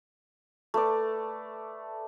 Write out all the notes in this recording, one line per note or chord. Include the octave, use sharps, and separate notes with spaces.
A3 B4 D5